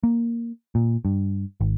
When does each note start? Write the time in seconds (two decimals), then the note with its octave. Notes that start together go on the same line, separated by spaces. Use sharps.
0.03 A#3
0.75 A#2
1.05 G2
1.61 G#1